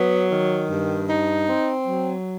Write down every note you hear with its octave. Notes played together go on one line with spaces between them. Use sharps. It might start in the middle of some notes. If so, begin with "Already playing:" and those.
Already playing: F#3 B3
D#3
G2
D#4
C4
F#3